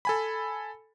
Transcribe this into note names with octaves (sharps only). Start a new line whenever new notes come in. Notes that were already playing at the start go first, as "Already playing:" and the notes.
A4 G#5 B5